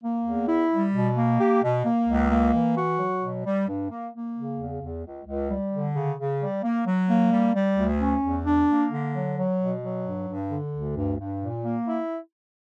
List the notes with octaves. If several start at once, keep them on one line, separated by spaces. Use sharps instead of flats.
A#3
E2
E4
G3
B2
A#3
G4
B2
A#3
C#2
A#3
E3
F#4
F#3
B2
G3
G2
A#3
A#3
C#3
E2
E2
C#2
C#2
G3
D3
C#3
C#3
G3
A#3
F#3
A#3
G3
G3
D2
C#4
E2
D4
A#3
D3
F#3
F#3
B2
F#3
G2
G2
D3
D2
G2
G2
A#2
A#3
E4